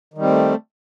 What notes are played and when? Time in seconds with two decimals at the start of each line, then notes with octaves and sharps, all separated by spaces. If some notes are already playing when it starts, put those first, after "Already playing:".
0.14 D#3
0.18 G3
0.22 C4
0.26 A3